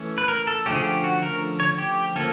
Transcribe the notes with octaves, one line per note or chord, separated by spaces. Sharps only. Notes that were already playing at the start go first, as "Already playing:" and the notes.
Already playing: E3 A3 C#4
B4
A#4
A4
D3 F3 A3 C#4 G4
G#4
G4
F#4
A#4
C#5
G4
F3 A#3 C#4 A4